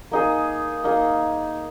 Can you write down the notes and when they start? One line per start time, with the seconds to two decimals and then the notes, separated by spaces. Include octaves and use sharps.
0.11 A#3 D#4 G#4
0.84 A#3 D#4 G#4